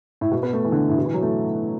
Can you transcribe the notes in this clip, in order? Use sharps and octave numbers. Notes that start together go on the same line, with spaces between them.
A2
B2
B3
A3
E3
D3
A2
B2
E3
F#3
A3